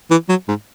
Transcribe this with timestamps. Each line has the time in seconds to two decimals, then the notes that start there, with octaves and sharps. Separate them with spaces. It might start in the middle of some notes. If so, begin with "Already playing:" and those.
0.11 E3
0.29 F#3
0.48 G#2